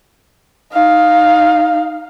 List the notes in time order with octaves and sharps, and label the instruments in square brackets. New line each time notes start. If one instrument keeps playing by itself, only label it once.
[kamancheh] D#4 F5